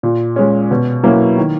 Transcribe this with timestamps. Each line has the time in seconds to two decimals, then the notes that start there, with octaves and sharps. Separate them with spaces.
0.03 A#2
0.36 G#3 C#4
0.71 B2
1.03 F#3 A#3 C#4 E4
1.38 D#3